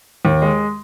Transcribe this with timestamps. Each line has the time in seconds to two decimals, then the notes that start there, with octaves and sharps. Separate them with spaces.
0.25 D#2
0.42 G#3